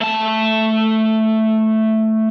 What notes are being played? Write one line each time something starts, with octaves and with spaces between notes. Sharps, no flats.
A3 A5